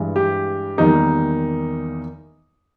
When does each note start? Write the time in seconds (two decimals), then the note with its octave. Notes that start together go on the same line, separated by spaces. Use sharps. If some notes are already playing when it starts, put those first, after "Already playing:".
Already playing: G2 E3 G#3
0.16 G4
0.78 E2 D#3 G3 A#3 D#4